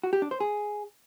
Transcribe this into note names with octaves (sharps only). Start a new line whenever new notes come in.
F#4
G4
D4
C5
G#4